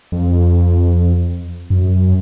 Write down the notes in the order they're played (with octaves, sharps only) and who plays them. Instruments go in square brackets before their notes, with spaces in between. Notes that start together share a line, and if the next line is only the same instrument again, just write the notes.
[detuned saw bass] F2
F#2